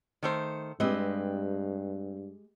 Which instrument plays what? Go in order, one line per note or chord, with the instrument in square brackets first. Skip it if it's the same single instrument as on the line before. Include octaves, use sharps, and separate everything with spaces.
[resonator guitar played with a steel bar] D#3 A3 C5
[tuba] G2 [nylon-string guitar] G#3 G4 [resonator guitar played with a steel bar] C4 B4 D#5